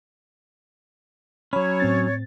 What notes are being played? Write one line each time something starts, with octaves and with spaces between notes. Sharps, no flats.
F#3 C#4 C#5 B5
A2 C4 A6